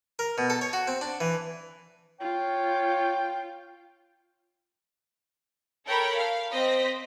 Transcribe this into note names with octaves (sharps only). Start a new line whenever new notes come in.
A#4
B2
A4
C#5
F#4
C4
D4
E3
F4 C#5 G5
A4 A#4 C#5 G5 B5
F5
C4 C5 D#5 B6